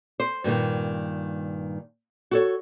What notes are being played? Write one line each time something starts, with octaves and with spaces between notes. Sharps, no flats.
C5
G2 A#2 D3 D#3
F#4 A4 C#5